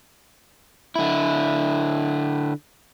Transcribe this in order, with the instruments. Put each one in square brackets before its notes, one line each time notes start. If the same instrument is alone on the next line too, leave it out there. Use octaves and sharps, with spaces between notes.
[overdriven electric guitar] D3 E4